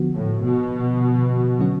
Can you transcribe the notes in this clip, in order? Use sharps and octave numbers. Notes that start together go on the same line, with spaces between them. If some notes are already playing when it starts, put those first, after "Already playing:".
Already playing: D3 F3 B3 F#4
A2
B2
D3 F#3 C#4 F#4